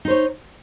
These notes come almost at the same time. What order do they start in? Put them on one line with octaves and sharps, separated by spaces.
D#4 C5 C#5